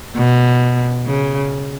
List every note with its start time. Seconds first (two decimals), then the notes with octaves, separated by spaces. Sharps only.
0.17 B2
1.06 C#3